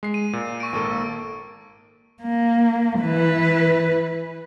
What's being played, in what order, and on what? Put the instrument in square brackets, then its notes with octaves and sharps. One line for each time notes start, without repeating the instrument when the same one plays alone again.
[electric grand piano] G#3 C7
[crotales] D#7
[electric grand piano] A#2
[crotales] C#6 D7
[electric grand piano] G#1 A#3 A4
[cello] A#3
E3 B4